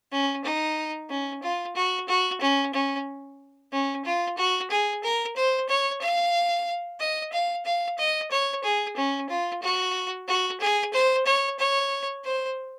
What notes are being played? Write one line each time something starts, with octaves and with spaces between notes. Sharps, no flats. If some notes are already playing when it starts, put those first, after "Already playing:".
C#4
D#4
C#4
F4
F#4
F#4
C#4
C#4
C#4
F4
F#4
G#4
A#4
C5
C#5
F5
D#5
F5
F5
D#5
C#5
G#4
C#4
F4
F#4
F#4
G#4
C5
C#5
C#5
C5